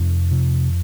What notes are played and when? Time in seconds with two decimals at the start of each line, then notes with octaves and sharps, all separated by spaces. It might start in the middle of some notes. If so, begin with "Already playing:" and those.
Already playing: F2 C3 C4
0.31 C3